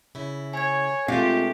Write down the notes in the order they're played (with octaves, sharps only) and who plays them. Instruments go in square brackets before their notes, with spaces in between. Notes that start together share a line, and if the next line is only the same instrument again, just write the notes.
[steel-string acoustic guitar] C#3 E4
[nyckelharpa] C#5 [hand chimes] G#5 G#6
[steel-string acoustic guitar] B2 G#3 A3 [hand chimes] C4 D4 C7 [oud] F4 [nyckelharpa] G4